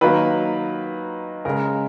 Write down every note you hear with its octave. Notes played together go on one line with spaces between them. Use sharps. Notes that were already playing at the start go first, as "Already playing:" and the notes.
D#3 F#3 A#3 B4 B5
C#3 G#3 A#4 A#5